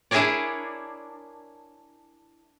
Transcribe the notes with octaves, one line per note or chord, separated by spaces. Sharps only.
D4 E4 G#4 A#4 C#5 D5